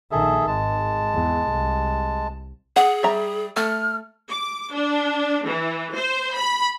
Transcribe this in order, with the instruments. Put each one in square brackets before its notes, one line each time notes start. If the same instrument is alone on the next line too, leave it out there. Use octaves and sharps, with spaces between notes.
[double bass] A#1 D#3 [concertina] G#4 A4 E5
[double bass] G#1 [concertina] G#3 A5
[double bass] E2
C2
[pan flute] G#4 [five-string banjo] F#5
[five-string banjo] G3 E5 A#5
[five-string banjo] A3 [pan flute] F6
[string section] D6
D4
E3
C5
B5